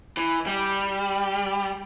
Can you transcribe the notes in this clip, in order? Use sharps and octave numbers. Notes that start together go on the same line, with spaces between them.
E3
G3